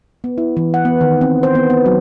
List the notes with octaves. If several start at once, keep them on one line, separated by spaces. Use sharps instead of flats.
B3
E4
E3
F#5
B3
D#3
C4
C5
B3
B3
F#3